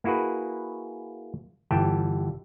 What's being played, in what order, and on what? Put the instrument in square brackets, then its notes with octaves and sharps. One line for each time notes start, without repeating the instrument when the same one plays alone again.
[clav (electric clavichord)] A#3 E4 F#4 G#4 B4
G1 E3 G4 G5 A5